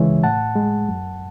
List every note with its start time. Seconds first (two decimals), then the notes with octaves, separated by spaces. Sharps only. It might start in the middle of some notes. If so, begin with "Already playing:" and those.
Already playing: D2 C#3 E3 G#3 C#5 E5
0.23 A2 F#5 A5
0.55 G#3
0.88 F#2